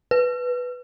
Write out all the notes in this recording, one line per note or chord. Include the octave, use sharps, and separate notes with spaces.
B4